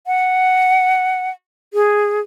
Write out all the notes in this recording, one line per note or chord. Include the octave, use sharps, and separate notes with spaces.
F#5
G#4